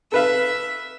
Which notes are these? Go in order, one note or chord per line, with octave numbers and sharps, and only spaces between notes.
A4 B4 E5 F5